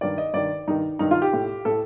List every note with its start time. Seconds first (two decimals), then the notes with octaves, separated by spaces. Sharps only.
0.01 G2 D#3 D5
0.18 D#5
0.34 G2 D#3 D5
0.68 G2 D#3 D#4
0.99 G2 D#3 D#4
1.11 F4
1.22 G4
1.33 A2
1.65 A2 A4